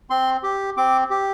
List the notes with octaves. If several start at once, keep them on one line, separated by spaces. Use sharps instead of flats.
C4 C6
G4
C4 D6
G4